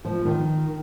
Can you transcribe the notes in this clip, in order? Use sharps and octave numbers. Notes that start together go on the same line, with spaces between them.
F3
D#3